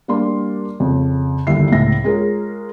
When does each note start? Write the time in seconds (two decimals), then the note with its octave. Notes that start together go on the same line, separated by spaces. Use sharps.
0.08 G3 A#3 D4 C6
0.80 F2 C#3
1.47 G1 D#2 E4 E5 C7
1.72 C#2 A2 E5 A#6
2.04 G#3 C#4 F4 G#4 A#4